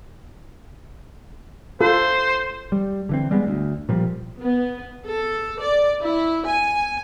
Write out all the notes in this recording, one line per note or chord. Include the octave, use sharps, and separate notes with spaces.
F4 A4 C5
G3
D3 E3 C4
G3 G#3 B3
D2
A#2 F3 G3
B3
A4
D5
E4
G#5